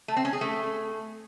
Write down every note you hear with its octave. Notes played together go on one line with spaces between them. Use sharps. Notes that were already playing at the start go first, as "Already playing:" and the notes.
A3
C4
C#4
G#4
A3